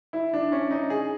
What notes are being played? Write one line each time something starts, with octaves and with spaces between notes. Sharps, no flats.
E4
D4
C#4
D#4
G#4